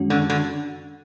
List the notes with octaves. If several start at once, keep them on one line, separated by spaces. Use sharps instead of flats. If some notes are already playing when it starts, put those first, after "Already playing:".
Already playing: F#2 D#3 G#3 C#4 F#4
D3
D3